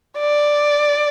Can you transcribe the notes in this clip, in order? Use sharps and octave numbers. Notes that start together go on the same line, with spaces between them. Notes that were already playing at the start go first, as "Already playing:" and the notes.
D5